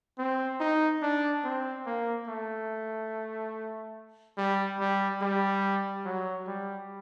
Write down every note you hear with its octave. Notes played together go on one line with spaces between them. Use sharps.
C4
D#4
D4
C4
A#3
A3
G3
G3
G3
F#3
G3